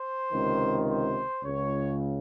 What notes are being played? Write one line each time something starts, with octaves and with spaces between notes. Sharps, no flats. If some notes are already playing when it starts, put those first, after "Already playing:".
Already playing: C5
C#2 C3 D#3
C5
C#2 C#3 C#5